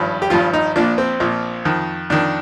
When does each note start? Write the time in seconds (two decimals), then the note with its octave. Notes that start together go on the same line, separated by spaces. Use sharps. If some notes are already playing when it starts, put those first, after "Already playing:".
Already playing: G#1 G2 F3
0.22 G4
0.30 G#1 G2 F3 F4
0.53 D#4
0.76 A#1 A#2 F3 D4
0.98 C4
1.20 A#1 A#2 F3
1.65 F2 D#3
2.10 F2 D#3 D4